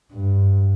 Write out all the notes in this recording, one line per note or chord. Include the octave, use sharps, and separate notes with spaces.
G2